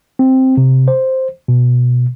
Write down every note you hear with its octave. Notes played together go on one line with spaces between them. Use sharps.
C4
C3
C5
B2